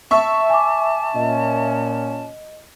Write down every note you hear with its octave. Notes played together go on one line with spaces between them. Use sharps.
E5 A5 C#6
G#5 D6
A#2 C#4 D#5